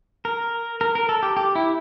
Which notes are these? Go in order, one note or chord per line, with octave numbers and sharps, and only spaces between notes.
A#4
A#4
A#4
A4
G4
G4
E4